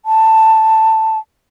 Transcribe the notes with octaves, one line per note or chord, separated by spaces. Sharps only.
A5